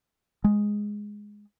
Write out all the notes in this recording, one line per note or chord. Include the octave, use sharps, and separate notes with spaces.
G#3